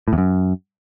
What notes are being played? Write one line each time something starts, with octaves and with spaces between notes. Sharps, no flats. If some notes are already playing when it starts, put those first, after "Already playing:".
A2
E2
F#2